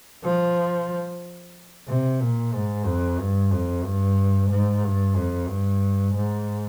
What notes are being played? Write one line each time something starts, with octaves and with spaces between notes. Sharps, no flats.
F3
C3
A#2
G#2
F2
G2
F2
G2
G#2
G2
F2
G2
G#2